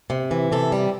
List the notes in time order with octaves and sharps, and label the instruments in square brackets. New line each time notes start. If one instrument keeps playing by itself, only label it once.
[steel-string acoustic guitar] C3
E3
C3 A4
G3